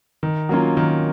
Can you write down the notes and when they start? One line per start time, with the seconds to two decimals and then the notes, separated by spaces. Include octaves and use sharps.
0.23 D#3
0.49 F#3 A#3 C#4 F4
0.77 D#3